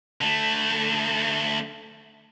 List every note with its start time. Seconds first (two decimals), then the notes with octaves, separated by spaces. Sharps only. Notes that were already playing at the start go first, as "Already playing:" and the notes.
0.21 D3 A3